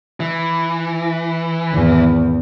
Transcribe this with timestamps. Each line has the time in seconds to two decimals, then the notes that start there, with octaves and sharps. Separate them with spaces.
0.20 E3
1.72 G#1 E2